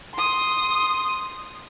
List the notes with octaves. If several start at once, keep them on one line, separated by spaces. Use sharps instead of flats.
C6 D#6